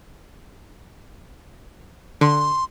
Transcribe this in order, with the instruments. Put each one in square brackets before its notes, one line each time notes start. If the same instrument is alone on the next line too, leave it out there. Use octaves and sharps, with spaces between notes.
[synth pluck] D3 [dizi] C6